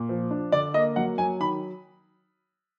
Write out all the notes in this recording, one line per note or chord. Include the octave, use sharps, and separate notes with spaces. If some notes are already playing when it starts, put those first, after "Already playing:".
Already playing: A#2
F3
D4
D3 D5
A#3 D#5
F#3 F#5
F#3 G#5
D#3 B5